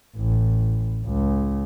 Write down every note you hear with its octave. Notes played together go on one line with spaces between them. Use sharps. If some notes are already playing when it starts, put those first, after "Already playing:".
A1
C#2